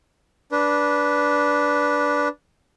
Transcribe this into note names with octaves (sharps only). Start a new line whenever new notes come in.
D4 B4